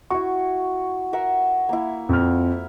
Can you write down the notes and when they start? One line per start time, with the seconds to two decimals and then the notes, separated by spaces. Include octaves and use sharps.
0.10 E4 F#4 C#6
1.13 A#4 E5 F#5
1.69 A#3 E4
2.09 F2 F6